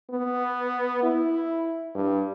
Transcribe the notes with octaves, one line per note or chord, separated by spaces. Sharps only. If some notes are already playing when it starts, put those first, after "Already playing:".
B3
E4
G2